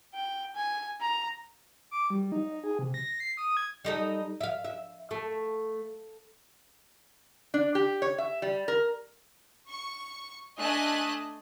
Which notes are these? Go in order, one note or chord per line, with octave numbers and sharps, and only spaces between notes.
G5
G#5
A#5
D6
G3
D#4
G#4
C3
A#6
C7
D#6
G#6
G3 D#4 A4
E5 F5
E5
A3
D4
G4
C#5
E5
G3
A#4
C#6
A3 D4 D#5 G#5 A5 F#6